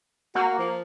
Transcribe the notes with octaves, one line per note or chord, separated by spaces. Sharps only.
A#3 F#4
F3